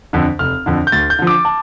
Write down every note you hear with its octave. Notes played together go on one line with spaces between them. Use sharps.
F2 D3
F1 F6
F2 D3
G6
D2 A6
G6
D3 F3
D6
A5